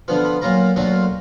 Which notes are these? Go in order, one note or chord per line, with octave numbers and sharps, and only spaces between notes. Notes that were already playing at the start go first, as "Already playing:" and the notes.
D3 F3 B3 F4
B5
A#2 F#3 A#3 F4 A#5
D2 D3 F#3 A#3 F4